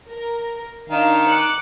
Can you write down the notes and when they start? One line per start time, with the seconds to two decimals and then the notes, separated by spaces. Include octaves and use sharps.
0.10 A#4
0.90 D#3 D4 D#4 F5
1.28 D6 F#6 C#7